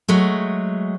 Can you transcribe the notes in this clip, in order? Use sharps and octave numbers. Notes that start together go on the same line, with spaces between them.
F#3 G#3 A3